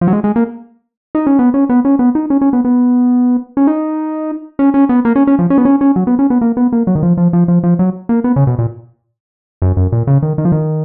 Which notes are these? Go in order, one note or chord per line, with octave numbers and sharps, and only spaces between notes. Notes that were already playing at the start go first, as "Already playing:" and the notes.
F3
F#3
G#3
G#3
A#3
D#4
C#4
B3
C#4
B3
C#4
B3
D#4
C#4
C#4
B3
B3
C#4
D#4
C#4
C#4
B3
A#3
C#4
C#4
F3
C#4
B3
C#4
C#4
F#3
B3
C#4
B3
A#3
B3
A#3
F#3
D#3
F3
F3
F3
F3
F3
F#3
A#3
B3
C#3
B2
A#2
F#2
F#2
A#2
C#3
D#3
D#3
F3
D#3